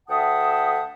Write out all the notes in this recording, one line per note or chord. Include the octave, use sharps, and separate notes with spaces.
D2 E5 F#5 G5 A5 D#6